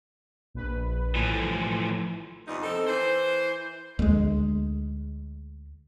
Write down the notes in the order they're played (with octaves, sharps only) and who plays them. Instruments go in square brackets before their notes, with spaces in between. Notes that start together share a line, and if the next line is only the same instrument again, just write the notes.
[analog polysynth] A#1 B4
[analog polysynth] A2 [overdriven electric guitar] E3 F3
[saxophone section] E2 G2 C3 F3 D#4
C4 D#4 A4
E3 C5
[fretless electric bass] D2 G#3